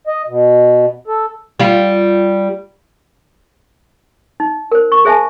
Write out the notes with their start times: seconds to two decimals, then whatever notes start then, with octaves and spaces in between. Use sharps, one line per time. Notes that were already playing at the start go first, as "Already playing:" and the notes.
0.07 D#5
0.28 B2
1.08 A4
1.60 G3 F4
4.40 D#4
4.71 A#4 C5
4.92 C#6
5.05 G#4 C5 E5 G#5 A5